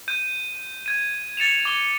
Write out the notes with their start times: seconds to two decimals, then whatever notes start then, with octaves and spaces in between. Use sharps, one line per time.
0.08 G6 D#7
0.86 G#6 D#7
1.37 A6 C#7 E7 F7
1.65 D6 G7